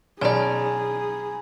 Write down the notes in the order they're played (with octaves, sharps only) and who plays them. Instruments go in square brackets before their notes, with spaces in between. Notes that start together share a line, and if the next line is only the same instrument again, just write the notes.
[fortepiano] B1 [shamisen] C#4 D5 [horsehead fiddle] G#4 [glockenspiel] G#5 A#5 B5